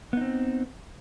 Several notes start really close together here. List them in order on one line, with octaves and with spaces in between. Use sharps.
B3 D#4 C4